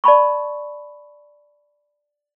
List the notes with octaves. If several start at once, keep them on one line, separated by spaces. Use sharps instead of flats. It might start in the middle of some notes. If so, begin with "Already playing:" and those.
D5 A5 B5 C#6